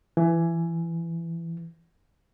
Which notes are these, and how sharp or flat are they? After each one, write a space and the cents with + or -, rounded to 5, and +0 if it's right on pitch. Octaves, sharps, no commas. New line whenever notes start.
E3 +20